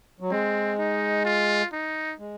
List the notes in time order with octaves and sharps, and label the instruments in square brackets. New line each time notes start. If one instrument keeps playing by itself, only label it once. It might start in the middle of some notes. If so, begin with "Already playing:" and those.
[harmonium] F#3
[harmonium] G#3 [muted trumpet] C4
[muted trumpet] D#4
F4
D#4
[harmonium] G#3